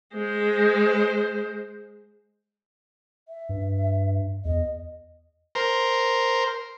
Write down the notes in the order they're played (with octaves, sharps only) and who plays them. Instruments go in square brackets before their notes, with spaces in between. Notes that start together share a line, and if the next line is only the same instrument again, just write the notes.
[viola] G#3 C5
[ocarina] E5
[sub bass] G2
[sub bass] E2 [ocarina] D#5
[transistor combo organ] A#4 C5